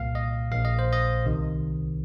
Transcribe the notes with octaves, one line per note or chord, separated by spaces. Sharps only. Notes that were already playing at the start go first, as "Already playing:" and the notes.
Already playing: C2 A#2 F5
D#5
A#1 A#2 F5
D#5
C5
D#5
C2 C3 D#3